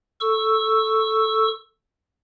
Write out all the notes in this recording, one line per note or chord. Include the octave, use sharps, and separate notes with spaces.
A4 C#6 E6